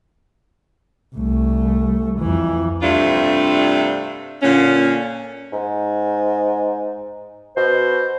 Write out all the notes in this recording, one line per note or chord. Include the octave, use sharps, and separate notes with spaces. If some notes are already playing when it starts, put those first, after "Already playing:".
C2 A3
F2 E3
G2 C3 A3 C4 D4 F4
A#2 D3 C#4
G#2
B2 C5